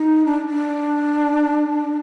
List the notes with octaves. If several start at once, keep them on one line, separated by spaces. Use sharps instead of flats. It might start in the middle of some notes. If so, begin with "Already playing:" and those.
Already playing: D#4
D4
D4